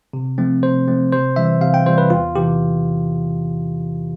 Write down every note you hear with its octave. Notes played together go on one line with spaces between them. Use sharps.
C3
F3 A3 C4
C3 C5
F3 A3 C4
C3 C5
E3 G3 E5
C3 F5
G5
E3 G3 C5
B4
E2 F4
C3 E3 G4